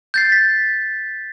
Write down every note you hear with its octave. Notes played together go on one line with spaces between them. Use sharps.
G6 A6 C7
B6